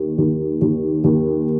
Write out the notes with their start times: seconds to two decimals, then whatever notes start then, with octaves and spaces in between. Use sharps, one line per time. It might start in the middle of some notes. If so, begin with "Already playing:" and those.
Already playing: D#2 D#3
0.18 D#2
0.61 D#2
1.04 D#2